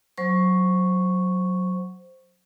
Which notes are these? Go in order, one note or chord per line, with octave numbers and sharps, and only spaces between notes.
F#3 C5 C#6